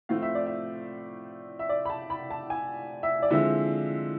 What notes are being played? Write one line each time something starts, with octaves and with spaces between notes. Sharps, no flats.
A2 F3 A3 C4 F5
E5
D5
E5
E5
D5
B5
A5
B5
A5
G#5
E5
D5
D3 F3 G#3 C4 E4 E5